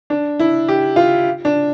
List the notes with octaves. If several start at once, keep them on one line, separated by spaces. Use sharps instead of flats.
D4
E4
G4
F4
D4